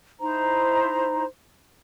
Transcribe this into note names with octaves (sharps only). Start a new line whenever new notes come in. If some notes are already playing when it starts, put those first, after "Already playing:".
D#4 E4 C5 A#5